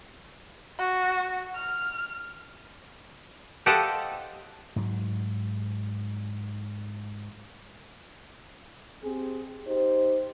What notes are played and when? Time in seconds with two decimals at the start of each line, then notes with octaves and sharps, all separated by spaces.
0.79 F#4
1.55 F6
3.66 G4 A4 C5 D#5 F5 F#5
4.76 G#2 F#3
9.03 C4 G4 G#4
9.67 D#4 G4 C5